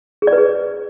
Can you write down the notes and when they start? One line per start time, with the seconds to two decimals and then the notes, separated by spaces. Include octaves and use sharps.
0.22 G#4
0.27 D5
0.33 B4
0.38 G#4